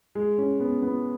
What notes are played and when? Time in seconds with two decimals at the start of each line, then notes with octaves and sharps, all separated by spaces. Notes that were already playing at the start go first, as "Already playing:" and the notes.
0.15 G#3
0.38 C#4
0.60 B3
0.82 B3